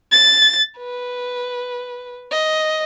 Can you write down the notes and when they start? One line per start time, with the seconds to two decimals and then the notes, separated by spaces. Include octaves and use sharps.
0.12 A6
0.78 B4
2.32 D#5